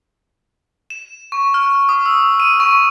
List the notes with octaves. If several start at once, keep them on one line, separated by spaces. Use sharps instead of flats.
E7
C#6
F6
D#6
E6
D#7
C#6